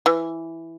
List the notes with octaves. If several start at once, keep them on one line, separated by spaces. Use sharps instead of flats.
E3